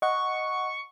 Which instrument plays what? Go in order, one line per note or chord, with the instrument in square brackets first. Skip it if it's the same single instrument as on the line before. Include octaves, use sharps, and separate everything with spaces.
[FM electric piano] D#5 F#5 [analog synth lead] C#6